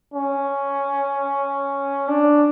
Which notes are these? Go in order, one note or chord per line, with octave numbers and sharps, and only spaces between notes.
C#4
D4